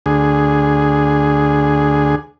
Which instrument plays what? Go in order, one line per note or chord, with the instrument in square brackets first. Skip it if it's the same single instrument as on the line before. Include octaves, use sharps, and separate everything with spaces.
[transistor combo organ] D2 G#4